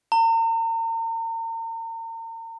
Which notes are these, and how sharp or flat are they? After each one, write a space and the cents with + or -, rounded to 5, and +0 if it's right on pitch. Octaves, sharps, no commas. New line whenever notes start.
A#5 -40